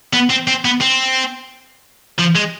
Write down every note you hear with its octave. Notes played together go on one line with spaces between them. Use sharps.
B3
C4
C4
B3
C4
F3
G#3